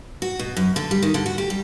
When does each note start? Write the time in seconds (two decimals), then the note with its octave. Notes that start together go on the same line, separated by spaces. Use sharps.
0.22 F#4
0.39 B2
0.57 F#2
0.76 D3
0.91 G3
1.03 D#3
1.14 D3
1.26 F#4
1.38 G4
1.50 G3